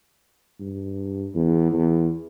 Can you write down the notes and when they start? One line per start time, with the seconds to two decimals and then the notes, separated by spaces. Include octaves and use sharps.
0.60 G2
1.35 E2
1.72 E2